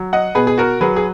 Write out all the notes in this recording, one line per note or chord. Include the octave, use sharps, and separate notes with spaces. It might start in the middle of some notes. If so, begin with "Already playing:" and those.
Already playing: F#3
D#5 F#5
B2 G#4 B4
G#4
F#4 A#4
F#3 G#4 B4
G#4